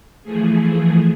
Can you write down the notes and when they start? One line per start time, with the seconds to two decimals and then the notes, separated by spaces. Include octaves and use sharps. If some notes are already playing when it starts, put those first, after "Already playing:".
0.23 E3 F3 A3 G#4